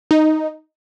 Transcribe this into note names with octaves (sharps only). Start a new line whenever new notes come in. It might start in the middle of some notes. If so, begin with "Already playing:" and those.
D#4